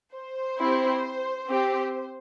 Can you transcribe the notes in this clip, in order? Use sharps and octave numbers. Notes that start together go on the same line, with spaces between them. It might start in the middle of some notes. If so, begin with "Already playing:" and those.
C5
C4 E4 G4
C4 G4